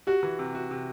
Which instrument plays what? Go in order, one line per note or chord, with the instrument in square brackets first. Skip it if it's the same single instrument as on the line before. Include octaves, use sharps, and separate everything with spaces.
[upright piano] F#4 [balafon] G4
[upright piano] E3
C3
F#4
C3